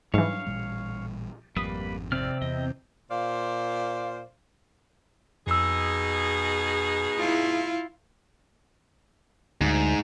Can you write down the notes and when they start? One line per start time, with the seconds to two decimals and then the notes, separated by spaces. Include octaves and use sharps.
0.14 G#2 E3 F#3 G3 D4 C#5 F5
0.46 A1 A#2 G3
1.56 G#1 F2 G3 A#3 B4 D#6
2.12 C3 C4 D5 F6
2.42 E2 D#5
3.11 A#2 C5 D5 F5
5.47 F2 B2 D#4 G#4 E6
7.18 E4 F4
9.61 D2 G#2